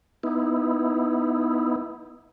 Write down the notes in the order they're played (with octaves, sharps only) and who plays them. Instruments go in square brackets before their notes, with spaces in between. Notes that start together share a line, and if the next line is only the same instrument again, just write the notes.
[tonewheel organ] B3 D#4 E4